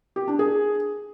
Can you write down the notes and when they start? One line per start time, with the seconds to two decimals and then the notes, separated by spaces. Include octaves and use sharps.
0.16 G4
0.28 D4
0.39 G#4